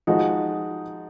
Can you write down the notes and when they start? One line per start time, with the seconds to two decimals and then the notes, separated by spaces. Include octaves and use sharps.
0.07 F3 G#3 D#4 F#4